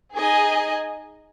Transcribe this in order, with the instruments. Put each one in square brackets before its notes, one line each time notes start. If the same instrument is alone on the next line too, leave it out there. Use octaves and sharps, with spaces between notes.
[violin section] D#4 G#4 D#5 G#5